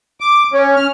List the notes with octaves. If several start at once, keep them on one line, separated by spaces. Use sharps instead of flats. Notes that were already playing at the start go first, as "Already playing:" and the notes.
D6
C#4
F6